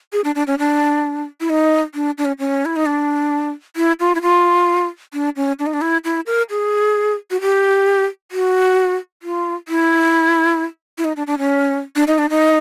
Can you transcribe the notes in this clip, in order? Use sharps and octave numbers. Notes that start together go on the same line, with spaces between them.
G#4
D4
D4
C#4
D4
E4
D#4
D4
D4
C#4
C#4
E4
D#4
D4
E4
F4
E4
F4
D4
C#4
D4
D#4
D4
E4
E4
A#4
G#4
F#4
G4
F#4
F4
E4
E4
D#4
D4
D4
C#4
D4
D#4
D4
D#4